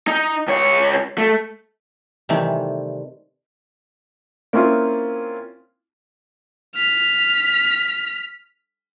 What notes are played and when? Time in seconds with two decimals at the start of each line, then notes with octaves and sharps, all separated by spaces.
0.08 D#4
0.48 C#2 C#5
1.18 A3
2.29 C3 D#3 E3 G3 A3 C4
4.53 A#3 C4 C#4 E4 F4
6.75 F6 B6